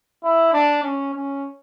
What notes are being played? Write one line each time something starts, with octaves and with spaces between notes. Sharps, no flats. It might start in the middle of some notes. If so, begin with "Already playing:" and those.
E4
D4
C#4
C#4